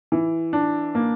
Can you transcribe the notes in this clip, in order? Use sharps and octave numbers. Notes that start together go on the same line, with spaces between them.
E3
D4
A#3